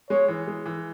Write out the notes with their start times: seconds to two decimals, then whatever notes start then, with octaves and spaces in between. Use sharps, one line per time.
0.10 G#3 C#5
0.28 E3
0.47 G#3
0.66 E3